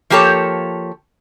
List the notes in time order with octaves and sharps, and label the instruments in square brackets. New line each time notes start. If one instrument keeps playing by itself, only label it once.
[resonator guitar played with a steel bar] F3 A#3 G4 A4 C#5